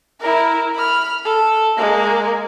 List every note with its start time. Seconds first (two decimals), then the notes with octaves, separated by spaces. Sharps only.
0.20 E4 A#4
0.75 B5 F6
1.25 A4
1.76 G#3 A#3